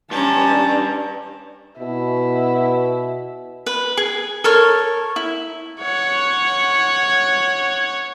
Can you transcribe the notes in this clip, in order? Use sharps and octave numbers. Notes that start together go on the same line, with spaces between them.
G2 C#4 A5 A#5
B2 E4
B4
G#4
A4 A#4 C#5
E4
C#5 F#5